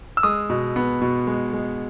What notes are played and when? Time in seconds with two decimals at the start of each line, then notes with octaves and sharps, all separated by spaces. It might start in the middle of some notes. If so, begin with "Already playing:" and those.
0.17 E6
0.23 G#3 D#6
0.50 B2
0.76 B3
1.02 B2
1.27 G#3
1.54 G#3